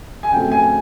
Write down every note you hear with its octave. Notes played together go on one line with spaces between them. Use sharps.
G#5
C#3 F#3 A3 C4 G5
G#5